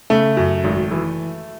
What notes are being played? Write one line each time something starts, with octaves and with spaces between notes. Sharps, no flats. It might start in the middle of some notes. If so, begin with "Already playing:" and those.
C#3 A3
F#2
G#1
E3